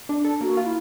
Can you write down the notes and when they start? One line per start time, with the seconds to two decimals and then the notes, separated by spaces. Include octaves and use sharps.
0.09 D4
0.25 A4
0.41 A#3 F#4
0.57 F4
0.65 E4